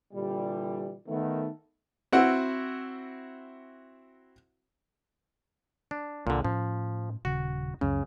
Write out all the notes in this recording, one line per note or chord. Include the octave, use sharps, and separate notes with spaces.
A#2 D3 E3 G3
D#3 A3 B3
C4 E4 F#4 F#5
D4
C2 A#2 D3
A2 F3 C#4
D#1 C#3 F#4
C#2 F#2 C#3 C#4